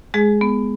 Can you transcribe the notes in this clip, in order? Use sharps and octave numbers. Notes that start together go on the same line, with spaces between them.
G#3 G#4
B3